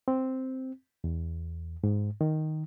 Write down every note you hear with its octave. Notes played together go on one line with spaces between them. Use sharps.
C4
E2
G#2
D#3